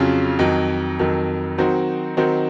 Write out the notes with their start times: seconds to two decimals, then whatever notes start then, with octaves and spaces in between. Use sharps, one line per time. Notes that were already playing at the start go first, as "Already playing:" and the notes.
Already playing: F2 C#3 F#3 C#4 F4
0.39 F2 D#3 F#3
0.99 F2 D#3 F#3
1.58 D#3 F#3 C4 D#4 F#4
2.17 D#3 F#3 C4 D#4 F#4